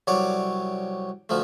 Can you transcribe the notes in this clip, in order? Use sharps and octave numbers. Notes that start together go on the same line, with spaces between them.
C2 F#3 C#5 D5 D6
D2 F3 A3